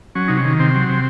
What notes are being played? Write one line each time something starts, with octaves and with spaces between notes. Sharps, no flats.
F#3 C#4
C3 D#4
C#4
D#3
C3 C4
F#3
C3